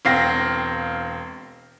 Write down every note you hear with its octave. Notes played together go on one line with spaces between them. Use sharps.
E1 C4 F5 A#6